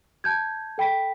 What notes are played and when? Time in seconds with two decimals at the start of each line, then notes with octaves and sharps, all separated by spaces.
0.24 A5 G6 G#6
0.78 A4 G5 B5 B6